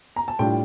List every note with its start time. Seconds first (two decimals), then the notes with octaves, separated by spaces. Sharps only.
0.16 A#5
0.28 A5
0.39 A2 G3 D4 F4 G5